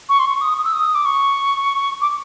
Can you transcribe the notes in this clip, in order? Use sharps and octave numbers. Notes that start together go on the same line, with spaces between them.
C#6
C6
C#6
D#6
D#6
E6
D#6
D6
C#6
D6